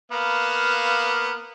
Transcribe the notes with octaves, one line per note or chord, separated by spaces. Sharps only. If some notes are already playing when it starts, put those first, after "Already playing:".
A#3 B3 F5